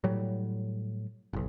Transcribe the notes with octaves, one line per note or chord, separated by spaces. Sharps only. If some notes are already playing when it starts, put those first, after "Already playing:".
A2 F#3 G3
F#1 B1